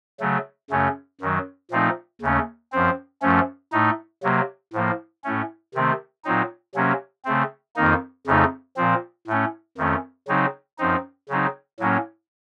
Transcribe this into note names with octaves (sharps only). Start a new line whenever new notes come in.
C#3 F#3 A3
F#2 C#3 A3 C#4
F#2 D#3 F#3
A#2 F3 A3 C4 D#4
D#2 C#3 A3 C#4
F#2 F3 C4
F#2 F3 A3 C#4
A2 A3 D#4
C3 F#3 A#3
A2 F3 A#3
A2 A3 C#4
C3 D#3 A3 C4
A#2 F#3 C4 D#4
C3 F#3 A#3 C#4
C#3 A3 C4
F2 D#3 A#3 D#4
F2 C#3 A3 D#4
A#2 F3 C4
A2 A3 C#4
F2 D#3 A3 C#4
C#3 F#3 C4 D#4
F#2 F3 C4 D#4
C#3 F#3 C4 D#4
A2 F#3 A#3 C#4